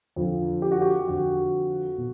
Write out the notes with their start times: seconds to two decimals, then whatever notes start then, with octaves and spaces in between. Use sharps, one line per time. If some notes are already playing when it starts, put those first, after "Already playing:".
0.16 F2 D3 F3
0.62 G4
0.72 F#4
0.82 G4
1.07 F2 D3 F3 F#4
1.98 B2